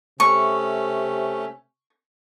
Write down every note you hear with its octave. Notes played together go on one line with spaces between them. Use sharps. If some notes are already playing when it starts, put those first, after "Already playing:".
C3 A3 C#4 C#6